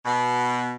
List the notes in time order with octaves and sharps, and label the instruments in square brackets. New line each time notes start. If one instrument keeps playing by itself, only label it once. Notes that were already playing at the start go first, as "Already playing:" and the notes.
[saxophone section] B2